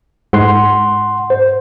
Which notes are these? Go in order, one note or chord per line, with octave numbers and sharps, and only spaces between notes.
G#2 F#5 C6
C5